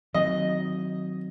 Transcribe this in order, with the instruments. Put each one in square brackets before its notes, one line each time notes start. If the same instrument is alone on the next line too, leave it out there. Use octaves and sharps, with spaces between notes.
[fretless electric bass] D#3 F#3 C4 [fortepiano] D#5